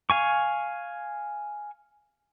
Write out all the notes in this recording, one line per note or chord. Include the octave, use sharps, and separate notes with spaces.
F5 G#5 C#6